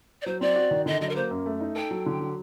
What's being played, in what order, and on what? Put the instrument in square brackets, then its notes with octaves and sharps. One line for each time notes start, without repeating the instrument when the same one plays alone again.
[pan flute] D5
[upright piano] F#3 [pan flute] C5
[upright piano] C4 [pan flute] D5
[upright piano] F#4
D#3
[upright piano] D3 [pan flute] D#5
[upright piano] F#3 [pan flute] D#5
[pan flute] A#4
[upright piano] A#3 [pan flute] C5
[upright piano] F#2
A3
D#4
[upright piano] A4 [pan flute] G5
[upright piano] F#3
D3
F#3